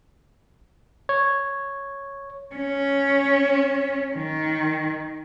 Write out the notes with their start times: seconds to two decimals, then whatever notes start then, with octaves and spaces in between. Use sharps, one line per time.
1.09 C#5
2.55 C#4
4.16 D#3